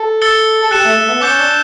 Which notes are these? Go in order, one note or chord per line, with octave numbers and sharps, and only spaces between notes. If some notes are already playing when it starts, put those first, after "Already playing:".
Already playing: A4
E6 A6 C#7 G7
A4
G4 F#6 C#7 E7
A3
A3
B3
C#4 D6 G6 C#7 G7
D4